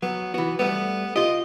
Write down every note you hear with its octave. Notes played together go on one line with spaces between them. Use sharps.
F#3 B3
E3 B3 F#4
G3 A3 B3
F4 G4 D#5